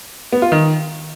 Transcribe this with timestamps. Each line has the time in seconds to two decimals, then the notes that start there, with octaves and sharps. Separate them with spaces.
0.32 B3
0.42 F4
0.52 D#3